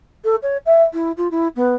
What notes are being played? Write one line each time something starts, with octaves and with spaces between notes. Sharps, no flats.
A4
C#5
E5
E4
F4
E4
B3